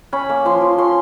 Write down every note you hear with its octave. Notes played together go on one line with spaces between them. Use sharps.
C#4 B5
A#3
F3 C6
F3
C#4 C6